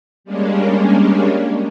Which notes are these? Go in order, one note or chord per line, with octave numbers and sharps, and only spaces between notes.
G3 G#3 A#3 C#4 D4